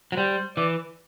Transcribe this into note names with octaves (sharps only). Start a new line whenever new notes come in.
F#3
G3 C5
E3 D5